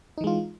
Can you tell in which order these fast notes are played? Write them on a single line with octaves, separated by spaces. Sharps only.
D#4 E3 G#3 F4